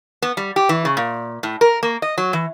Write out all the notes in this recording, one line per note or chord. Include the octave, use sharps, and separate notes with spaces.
B3
G3
G4
E3
C#3
A#2
A2
A#4
A#3
D#5
F#3
E3